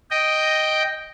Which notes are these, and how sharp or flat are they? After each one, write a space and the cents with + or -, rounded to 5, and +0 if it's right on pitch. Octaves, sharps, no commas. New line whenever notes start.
D#5 +0 G5 +0